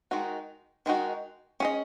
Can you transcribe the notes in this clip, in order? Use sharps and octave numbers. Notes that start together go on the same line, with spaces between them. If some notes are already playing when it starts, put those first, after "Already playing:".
D#3 G#3 D#4 F#4
D#3 G#3 D#4 F#4
C#4 G#4 D#5